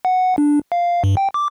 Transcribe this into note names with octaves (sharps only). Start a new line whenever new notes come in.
F#5
D4
F5
G2
G5
D6